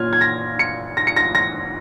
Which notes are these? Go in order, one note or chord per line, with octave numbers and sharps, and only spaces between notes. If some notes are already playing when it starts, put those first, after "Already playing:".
Already playing: A#2 C#4 F4 F6 G#6
G#6
A#6
C#7
A#6
C#7
A#6
A#6